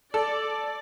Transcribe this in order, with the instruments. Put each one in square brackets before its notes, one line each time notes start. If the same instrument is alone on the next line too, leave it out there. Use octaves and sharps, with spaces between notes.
[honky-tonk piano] A4 [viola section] D5